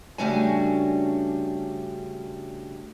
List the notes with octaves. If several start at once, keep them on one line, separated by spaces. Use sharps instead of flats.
C#3 G3 A3 D4 F#4 G#5